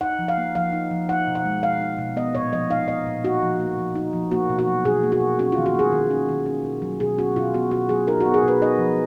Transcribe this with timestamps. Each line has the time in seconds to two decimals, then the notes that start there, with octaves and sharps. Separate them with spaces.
0.01 D#4 F#5
0.19 F3
0.28 F5
0.37 A#3
0.55 F3 F5
0.72 D#4
0.91 F3
1.09 D#4 F#5
1.27 B2
1.35 F#5
1.45 G#3
1.63 B2 F5
1.81 D#4
1.98 B2
2.16 B3 D#5
2.35 A#2 C#5
2.52 F3 D#5
2.70 D#4 F5
2.88 B3 D#5
3.06 A#2
3.24 D#4 F#4
3.42 F3
3.60 A#3
3.78 F3
3.96 D#4
4.13 F3
4.31 A#3 F#4
4.50 B2
4.59 F#4
4.67 F#3
4.85 B2 G#4
5.03 A#3
5.12 F#4
5.20 B2
5.39 C#4 F#4
5.52 F4
5.57 D#3
5.66 F#4
5.74 A#3 G#4
5.92 D#3
6.11 C#4
6.29 D#3
6.46 C#4
6.65 B2
6.82 F#3
7.00 B2 G#4
7.18 C#4 F#4
7.36 B2 F4
7.54 B3 F#4
7.71 B2 F#4
7.89 F#3 G#4
8.07 D#4 A#4
8.20 F#4
8.26 B3
8.34 G#4
8.43 B2 B4
8.62 D#4 D#5
8.79 F3